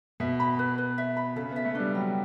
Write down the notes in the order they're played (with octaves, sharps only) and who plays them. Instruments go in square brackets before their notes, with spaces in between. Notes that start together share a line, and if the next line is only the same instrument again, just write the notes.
[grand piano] B2 [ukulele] E5
[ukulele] B5
B4
B4
E5
B5
[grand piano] C#3 [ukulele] A4
[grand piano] B3 [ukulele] E5
[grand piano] A3
[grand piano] G3 [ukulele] D4
[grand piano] F#3 [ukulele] G5